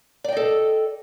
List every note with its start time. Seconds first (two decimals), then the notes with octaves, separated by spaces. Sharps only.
0.24 D5
0.28 G5
0.33 D#5
0.37 A4